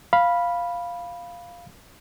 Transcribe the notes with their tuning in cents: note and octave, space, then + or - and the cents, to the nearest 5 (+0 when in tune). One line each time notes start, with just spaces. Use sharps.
F5 +0 B5 -10